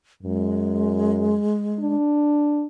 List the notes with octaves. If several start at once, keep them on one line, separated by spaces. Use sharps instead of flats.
F#2 G#3
D4